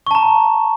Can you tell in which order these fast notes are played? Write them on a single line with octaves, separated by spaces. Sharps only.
C#6 A5 A#5